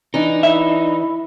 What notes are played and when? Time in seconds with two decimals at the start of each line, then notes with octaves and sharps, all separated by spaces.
0.14 E3 D4 D#4
0.43 E4 E5